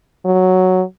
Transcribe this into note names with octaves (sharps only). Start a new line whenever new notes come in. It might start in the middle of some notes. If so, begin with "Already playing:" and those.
F#3